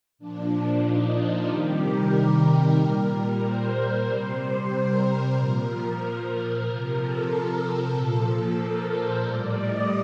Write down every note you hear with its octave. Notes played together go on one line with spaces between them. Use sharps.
A#2 F3 D4
D#4
F4
C3 D#3 G3 G4
A#4
A#2 G3
C5
C3 G3
A#4
A#2 F3 A#4
C3 F3 A#4
A4
A#2 F3
A#4
C5
A2 G3 D5
D#5